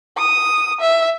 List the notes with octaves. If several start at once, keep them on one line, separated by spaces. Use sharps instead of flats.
D#6
E5